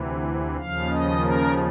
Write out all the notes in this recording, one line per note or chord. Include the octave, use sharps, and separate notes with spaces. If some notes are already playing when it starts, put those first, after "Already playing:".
Already playing: D2 C3 E3
D#2 C#3 F3 F5
D#5
A#4